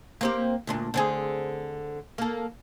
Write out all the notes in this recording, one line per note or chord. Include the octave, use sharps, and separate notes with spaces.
A#3 C4 G4
D2 A#2 D4
D3 C4 G#4
A#3 A4